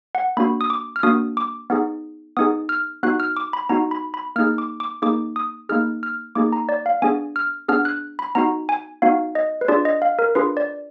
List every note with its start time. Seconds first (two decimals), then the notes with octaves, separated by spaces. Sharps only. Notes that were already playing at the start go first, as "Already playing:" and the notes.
0.15 F#5
0.37 A#3 D4 F#4 B5
0.61 D#6
0.70 D6
0.96 F6
1.03 A#3 D4 F#4 D#6
1.37 D6
1.70 B3 D#4 G#4
2.37 B3 D#4 G#4 D#6
2.69 F6
3.03 B3 D#4 F#4 F#6
3.20 F6
3.37 D6
3.53 B5
3.69 B3 D#4 F#4 A#5
3.91 B5
4.14 B5
4.36 A#3 D#4 G#4 F6
4.58 D6
4.80 D6
5.02 A#3 D#4 G#4 D6
5.36 D#6
5.69 A#3 D#4 G#4 F6
6.03 F6
6.35 A#3 D#4 G#4 D6
6.52 A#5
6.69 D5
6.86 F5
7.02 B3 D4 G#4 G#5
7.36 F6
7.68 B3 D4 G#4 F6
7.85 F#6
8.19 B5
8.35 B3 D#4 F#4 A#5
8.69 G#5
9.02 B3 D#4 F#4 F5
9.35 D#5
9.61 B4
9.68 D4 F4 G#4 D5
9.85 D#5
10.02 F5
10.19 A#4
10.35 D4 F4 G#4 B4
10.57 D5